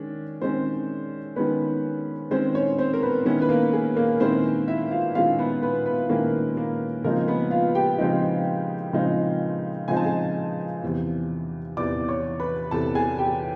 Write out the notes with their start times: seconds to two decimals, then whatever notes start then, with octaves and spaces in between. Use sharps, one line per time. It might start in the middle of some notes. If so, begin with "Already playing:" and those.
Already playing: D#3 G#3 C#4 D4
0.42 D#3 G#3 C4 C#4 C5
1.36 D#3 G#3 B3 C#4 B4
2.31 D#3 G#3 C4 C#4 C5
2.55 C#4 C#5
2.78 C4 C5
2.94 A#4
3.03 B3 B4
3.25 D#3 G#3 B3 C#4 E4 B4
3.42 B4
3.49 A#3 A#4
3.73 G#4
3.96 A#3 A#4
4.20 D#3 G#3 C4 C#4 E4 C5
4.68 E4 E5
4.91 F4 F5
5.15 D#3 G#3 C#4 E4 F4 F5
5.39 B3 B4
5.62 B3 B4
5.86 B3 B4
6.09 D#3 G#3 A#3 C#4 E4 A#4
6.57 A#3 A#4
7.04 C#3 F3 G#3 A#3 C4 D#4 A#4
7.28 B3 B4
7.51 F4 F5
7.75 G4 G5
7.99 C#3 F3 G#3 C4 D#4
8.93 C#3 F3 G#3 C4 D#4
9.88 C#3 F3 G#3 C4 D#4 G#5
9.97 A5
10.05 G#4 G#5
10.82 E2 C3 E3
11.77 E2 C3 E3 D5 D6
12.08 C#5 C#6
12.40 B4 B5
12.71 E2 C3 E3 A4 A5
12.95 G#4 G#5
13.18 G4 G5